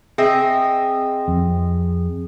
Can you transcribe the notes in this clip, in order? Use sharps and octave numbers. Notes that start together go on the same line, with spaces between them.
C4 G#4 D#5 E5
F2